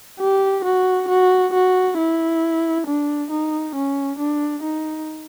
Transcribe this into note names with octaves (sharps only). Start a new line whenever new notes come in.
G4
F#4
F#4
F#4
E4
D4
D#4
C#4
D4
D#4